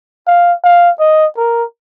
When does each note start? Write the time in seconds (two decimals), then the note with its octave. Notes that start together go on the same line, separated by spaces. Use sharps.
0.27 F5
0.64 F5
1.00 D#5
1.37 A#4